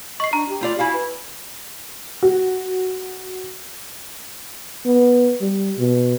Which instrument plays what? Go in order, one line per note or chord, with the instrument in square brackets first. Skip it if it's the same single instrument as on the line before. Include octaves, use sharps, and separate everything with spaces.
[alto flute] D#5 [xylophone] C#6 C7
[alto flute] D4 [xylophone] A#5
[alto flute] G4
[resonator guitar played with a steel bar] A3 F4 D5
[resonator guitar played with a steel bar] E4 F#4 F5 [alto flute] G#5
[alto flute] B4
[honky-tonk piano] F#4
[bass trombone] B3
G3
B2